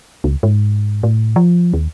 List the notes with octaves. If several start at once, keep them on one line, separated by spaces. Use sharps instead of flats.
C#2
G#2
A2
F3
D#2